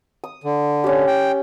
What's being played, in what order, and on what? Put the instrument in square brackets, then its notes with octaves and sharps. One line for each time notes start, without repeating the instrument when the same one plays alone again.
[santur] D#6
[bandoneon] D3
[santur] C#4 G4
[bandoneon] G5